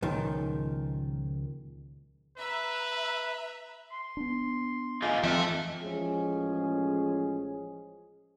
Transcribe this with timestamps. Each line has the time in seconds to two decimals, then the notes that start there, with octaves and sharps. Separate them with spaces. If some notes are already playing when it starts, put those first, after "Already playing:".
0.02 C#2 A#2 D#3 F3
2.37 B4 E5 A#5
3.92 C6
4.17 B3 D4
5.02 D#4 F4 G#4
5.23 F2 E3 A4 E5
5.82 A1 F3 G#3 C#4 G#4